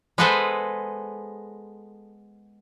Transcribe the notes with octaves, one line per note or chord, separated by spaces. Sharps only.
G#3 B3 G#4 A4 B4 C5